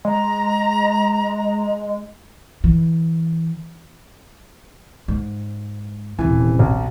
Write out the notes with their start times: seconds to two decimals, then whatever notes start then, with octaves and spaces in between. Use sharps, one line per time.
0.05 G#3 A#5
2.64 E3
5.08 G#2
6.19 D#1 C3 E3
6.59 B1